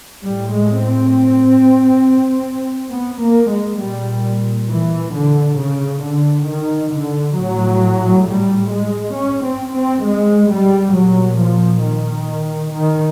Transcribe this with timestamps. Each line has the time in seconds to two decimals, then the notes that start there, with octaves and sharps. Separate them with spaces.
0.23 A2 G3
0.53 G#3
0.83 C4
2.91 B3
3.21 A#3
3.50 G#3
3.80 A#2 G3
4.70 E3
5.14 D3
5.59 C#3
6.03 D3
6.48 D#3
6.93 D3
7.37 A2 F#3
8.27 G3
8.71 G#3
9.15 C#4
9.45 C4
9.75 C4
10.04 G#3
10.50 G3
10.94 A#2 F#3
11.38 F3
11.83 D#3
12.72 D#3